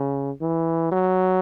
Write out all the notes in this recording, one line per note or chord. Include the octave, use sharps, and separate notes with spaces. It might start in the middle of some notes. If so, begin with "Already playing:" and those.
Already playing: C#3
E3
F#3